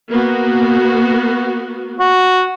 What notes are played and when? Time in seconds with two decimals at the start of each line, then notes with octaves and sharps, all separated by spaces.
0.10 A#3 B3 F#4
1.99 F#4